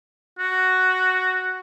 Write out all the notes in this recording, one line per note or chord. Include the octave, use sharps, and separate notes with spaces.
F#4